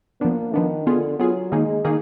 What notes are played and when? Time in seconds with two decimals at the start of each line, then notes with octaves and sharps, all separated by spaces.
0.21 F3 A#3 B3 D4
0.53 D#3 F3 B3 D4
0.86 D3 B3 F4 G#4
1.19 F#3 B3 F4 G#4
1.52 D#3 G#3 A#3 D#4 G#4
1.85 D#3 A#3 D#4 G#4